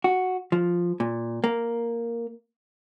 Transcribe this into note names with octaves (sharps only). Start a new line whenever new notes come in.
F#4
F3
A#2
A#3